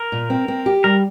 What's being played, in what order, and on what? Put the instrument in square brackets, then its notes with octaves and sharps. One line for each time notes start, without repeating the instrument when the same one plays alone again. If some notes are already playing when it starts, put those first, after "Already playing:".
Already playing: [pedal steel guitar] A#4
[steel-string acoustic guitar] A#2
C4
C4
G4
[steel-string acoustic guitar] G3 [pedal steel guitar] A#4